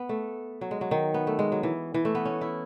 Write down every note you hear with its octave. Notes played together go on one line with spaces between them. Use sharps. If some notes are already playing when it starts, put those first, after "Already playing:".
Already playing: B3
A3
F#3
G#3
F#3
D#3
B3
A3
G#3
F#3
E3
E3
A3
B3
C#4
E4